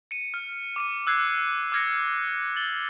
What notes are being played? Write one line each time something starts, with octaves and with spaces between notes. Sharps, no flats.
C#7 D#7
F6
D6 C#7 D#7
E6 F#6 G#6 C7
D6 F6 G#6 A#6 C#7
A6 F#7 G7